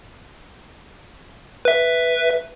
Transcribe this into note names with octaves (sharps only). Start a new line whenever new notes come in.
B4 E5